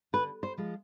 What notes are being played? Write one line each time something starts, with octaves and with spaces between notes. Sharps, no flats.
D3 B4
C5
F3 G#3